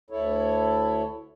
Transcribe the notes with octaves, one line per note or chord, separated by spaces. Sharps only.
D2 E4 A4 C#5